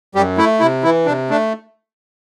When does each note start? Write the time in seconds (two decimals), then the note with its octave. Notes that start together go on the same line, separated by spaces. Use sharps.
0.15 F#2 G3 G4
0.37 A3 E4
0.60 C3 E4
0.83 E3 E4
1.06 C3 D4
1.30 A3 D4